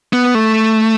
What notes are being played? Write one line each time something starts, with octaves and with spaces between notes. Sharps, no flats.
B3
A3